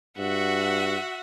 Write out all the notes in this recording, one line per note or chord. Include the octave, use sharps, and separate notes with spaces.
G2 F#4 E5 F#5